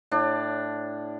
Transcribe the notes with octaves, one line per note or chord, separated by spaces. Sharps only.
A2 D4